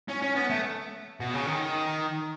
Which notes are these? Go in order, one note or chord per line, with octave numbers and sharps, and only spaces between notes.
C#4
C#4
B3
A3
B2
C#3
D#3